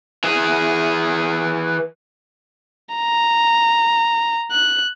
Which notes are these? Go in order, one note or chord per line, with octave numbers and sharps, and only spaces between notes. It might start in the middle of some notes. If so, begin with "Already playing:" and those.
E3 G#4
A#5
F#6